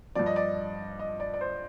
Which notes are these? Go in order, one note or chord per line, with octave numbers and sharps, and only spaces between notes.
G2 F3 D5
D#5
D5
D#5
D5
D5
C5